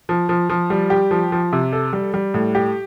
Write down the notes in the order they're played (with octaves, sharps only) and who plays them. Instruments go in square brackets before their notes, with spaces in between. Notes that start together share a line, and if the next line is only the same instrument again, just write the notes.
[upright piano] F3
F3
F3
G3
G4
F3
F3
C3
A4
G3
G3
A2
G4